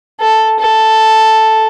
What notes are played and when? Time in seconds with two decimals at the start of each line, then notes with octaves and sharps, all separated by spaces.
0.21 A4
0.60 A4